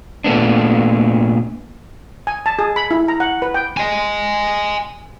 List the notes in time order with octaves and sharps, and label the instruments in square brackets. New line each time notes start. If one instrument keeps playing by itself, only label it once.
[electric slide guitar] A#2 A3 B3 D4
[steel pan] G#5
A5
G#4
B5
E4
A#5
F#5
B4
G5
[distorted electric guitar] D#5 G#5